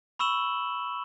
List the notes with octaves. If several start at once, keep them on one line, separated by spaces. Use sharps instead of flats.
B5 C#6 E6 E7 F#7 G7